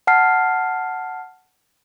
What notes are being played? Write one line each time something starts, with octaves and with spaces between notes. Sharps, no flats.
F#5 A5 F6 C7